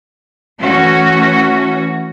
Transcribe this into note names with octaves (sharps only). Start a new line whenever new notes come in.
E3 A3 C#4 F#4